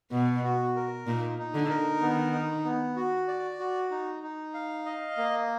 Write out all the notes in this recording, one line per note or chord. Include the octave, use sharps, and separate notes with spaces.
B2 B3
F#4
A#4
A#2 D#4
D#4
D3
A#4
D#3 B3
D#4
B3
F#4
D5
F#4
D#4
D#4
F5
D#5
A#3